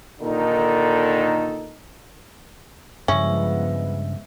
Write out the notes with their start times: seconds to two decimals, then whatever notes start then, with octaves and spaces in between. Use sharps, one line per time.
0.20 A#2 D3 D#3 D#4 A4
3.08 G2 C#3 F3 G#3 B3 C#4 E5